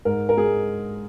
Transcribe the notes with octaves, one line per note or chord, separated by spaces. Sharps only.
G#2 A#4
A#4
G#3 G#4